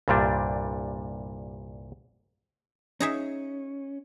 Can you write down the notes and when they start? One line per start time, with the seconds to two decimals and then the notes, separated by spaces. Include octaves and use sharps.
0.08 C2 G2 A#2 G3 D4
3.00 C#4 D#4 G#4 E5